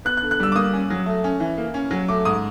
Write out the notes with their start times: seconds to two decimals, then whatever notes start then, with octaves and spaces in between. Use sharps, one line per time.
0.05 B3 F#6
0.17 F#6
0.22 D3
0.31 F#6
0.40 G3 E6
0.52 D6
0.55 A#3 D#6
0.73 C#4
0.90 F#3
1.06 A3
1.24 C#4
1.40 E3
1.58 A#3
1.74 C#4
1.91 F#3
2.09 A3 D6
2.25 G#2 D#6